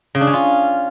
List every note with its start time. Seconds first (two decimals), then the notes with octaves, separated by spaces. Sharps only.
0.15 C#3
0.21 D4
0.27 C#4
0.34 F4